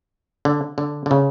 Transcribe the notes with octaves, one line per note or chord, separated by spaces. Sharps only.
D3
D3
D3
C#3